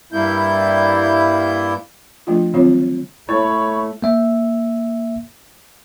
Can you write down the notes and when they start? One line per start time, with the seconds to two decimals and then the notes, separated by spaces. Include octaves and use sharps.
0.13 G2 G3 A#3 E4 G6
2.27 F3 A3 D4 F4
2.54 D3 D#3 F#3 C4 F4 C#5
3.29 A3 E4 C#5 B5
4.02 A#3 E5